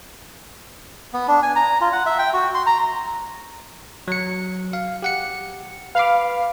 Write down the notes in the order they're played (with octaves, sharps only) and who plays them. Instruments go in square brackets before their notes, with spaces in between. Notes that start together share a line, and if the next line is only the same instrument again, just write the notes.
[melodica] B3
D4
G#5
A#5
F4
F#5
E5
G5
F#4
C6
A#5
[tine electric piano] F#3 C#7
F5
G4 F#5 C#7
[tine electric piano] B4 B5 D6 [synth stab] F5